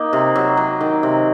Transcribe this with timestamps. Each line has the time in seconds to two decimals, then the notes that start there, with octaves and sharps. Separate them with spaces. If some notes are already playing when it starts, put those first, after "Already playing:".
Already playing: A#3 D#4
0.13 C3
0.35 F#3
0.57 F#3
0.81 D#3
1.03 C3